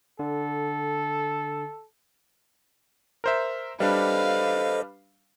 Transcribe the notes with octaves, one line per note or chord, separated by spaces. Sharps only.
D3 A4
A#4 C5 E5
G3 D4 A4 B4 C5 D#5 F5